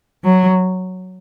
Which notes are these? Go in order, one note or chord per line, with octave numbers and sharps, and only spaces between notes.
F#3